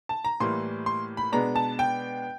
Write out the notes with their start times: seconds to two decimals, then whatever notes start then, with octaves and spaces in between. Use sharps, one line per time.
0.09 A5
0.25 A#5
0.40 A2 E3 G3 A#3 C6
0.86 C6
1.17 B5
1.32 B2 G#3 B3 D4 A#5
1.56 A5
1.79 G5